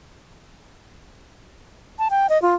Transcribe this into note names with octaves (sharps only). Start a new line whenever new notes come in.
A5
G5
D#5
F4